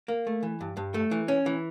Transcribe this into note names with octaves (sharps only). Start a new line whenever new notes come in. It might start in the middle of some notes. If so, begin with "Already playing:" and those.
A#3
A3
E3
G2
G2
A3
E3
C#4
E3